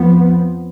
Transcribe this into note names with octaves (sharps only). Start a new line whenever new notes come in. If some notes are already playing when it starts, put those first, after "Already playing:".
Already playing: F2 F3 B3